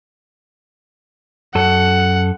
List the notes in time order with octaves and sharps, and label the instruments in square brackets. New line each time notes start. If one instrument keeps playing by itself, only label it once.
[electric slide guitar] F#2 A4 [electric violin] F#5